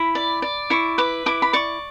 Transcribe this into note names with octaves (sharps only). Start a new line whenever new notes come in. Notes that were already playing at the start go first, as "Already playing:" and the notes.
Already playing: E4 B5
D5
D5
E4 C#6
B4 D6
E4 D6
B5
D5 C#6